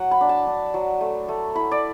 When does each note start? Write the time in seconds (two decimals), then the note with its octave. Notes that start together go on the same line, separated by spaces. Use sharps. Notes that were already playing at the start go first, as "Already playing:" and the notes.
Already playing: F#3 F#5
0.11 B5
0.21 D4
0.29 A5
0.47 D4
0.74 F#3
1.01 A3
1.29 A3
1.55 E4 B5
1.71 D5